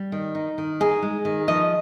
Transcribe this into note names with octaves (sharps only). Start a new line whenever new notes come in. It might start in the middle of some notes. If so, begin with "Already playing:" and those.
Already playing: G3
D#3
D#4
D#3
D#4 G#4
G#3
D#3
F3 D#5